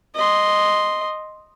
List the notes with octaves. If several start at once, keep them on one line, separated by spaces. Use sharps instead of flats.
D#5 C6